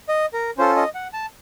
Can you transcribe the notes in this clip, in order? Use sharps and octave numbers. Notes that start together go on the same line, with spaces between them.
D#5
A#4
C#4 F4 A4 C5
D#5
F#5
A5